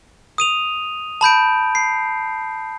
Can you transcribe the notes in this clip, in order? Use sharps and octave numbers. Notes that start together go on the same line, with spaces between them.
D#6 D#7 F7
A5 B5 G6 D7
C7